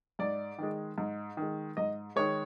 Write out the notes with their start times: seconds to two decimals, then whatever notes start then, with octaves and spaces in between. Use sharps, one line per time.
0.19 G#2 D5
0.58 D#3 G#3
0.98 G#2
1.37 D#3 G#3
1.77 G#2 D#5
2.16 D#3 G#3 C#5